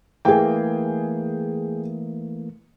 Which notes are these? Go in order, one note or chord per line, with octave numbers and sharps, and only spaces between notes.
E3 A3 A#3 G#4 G5